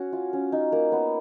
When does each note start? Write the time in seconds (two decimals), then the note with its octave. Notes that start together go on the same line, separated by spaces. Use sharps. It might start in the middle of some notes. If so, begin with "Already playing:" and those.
Already playing: C#4 F#4
0.13 F4
0.33 C#4
0.52 D#4
0.72 A#3
0.92 B3